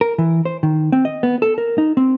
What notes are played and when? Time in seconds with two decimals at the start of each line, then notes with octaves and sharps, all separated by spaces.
0.01 A#4
0.18 E3
0.45 C5
0.63 D#3
0.92 C4
1.05 D#5
1.23 B3
1.42 A4
1.58 A#4
1.78 D#4
1.97 C4